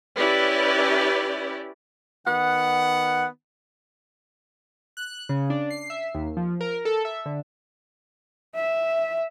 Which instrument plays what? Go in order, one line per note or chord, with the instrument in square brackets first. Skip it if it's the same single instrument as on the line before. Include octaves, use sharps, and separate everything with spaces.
[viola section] C#4 E4 G4 B4 D5
[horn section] D#3 B3 F#5
[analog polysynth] F#6
C#3
D4
C7
E5
D#2
F3
A#4
A4
E5
D3
[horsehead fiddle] E5